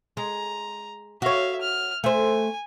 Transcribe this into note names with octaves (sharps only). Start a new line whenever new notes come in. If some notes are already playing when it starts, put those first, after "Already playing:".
G#3 A#5
F#4 C#5 E5 F5
F6
A3 C5 G#5